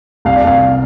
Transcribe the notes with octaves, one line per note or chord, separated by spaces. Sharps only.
C2 F5
D5
C2 F5